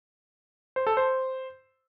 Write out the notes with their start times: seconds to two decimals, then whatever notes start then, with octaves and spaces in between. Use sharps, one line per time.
0.76 C5
0.87 A4
0.97 C5